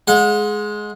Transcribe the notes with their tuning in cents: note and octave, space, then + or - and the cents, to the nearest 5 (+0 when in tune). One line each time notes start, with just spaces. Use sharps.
G#3 +15 F#5 -35